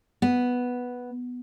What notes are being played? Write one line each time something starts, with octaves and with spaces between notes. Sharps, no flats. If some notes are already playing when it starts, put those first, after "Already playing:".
B3